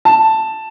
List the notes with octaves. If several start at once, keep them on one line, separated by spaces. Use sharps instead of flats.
A5